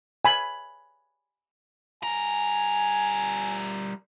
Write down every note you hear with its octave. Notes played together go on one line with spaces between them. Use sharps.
G#5 B5
G3 A#4 G#5